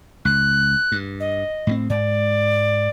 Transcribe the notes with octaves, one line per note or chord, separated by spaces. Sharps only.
C#2 F#6
G2
D#5
A2 G3 C4
G#2 D5